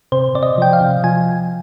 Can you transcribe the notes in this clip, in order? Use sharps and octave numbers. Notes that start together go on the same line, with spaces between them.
C3 C5
C3 D5
D#5
F3 G5
F5
C3
F3 G#5